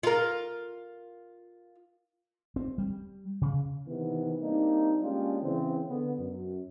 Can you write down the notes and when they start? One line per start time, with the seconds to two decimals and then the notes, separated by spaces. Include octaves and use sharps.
0.03 F4 A#4
2.56 C4
2.78 G3
3.42 C#3
3.87 C3 D#3 E3 B3
4.41 G3 A#3 C4 D4 D#4
5.02 G#3 A#3 C#4 D4 F4 G4
5.42 C#3 E3 C4
5.89 D3 B3
6.19 F#2